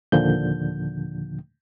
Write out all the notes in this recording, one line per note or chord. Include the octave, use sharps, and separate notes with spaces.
D#2 A#2 D3 F3 G6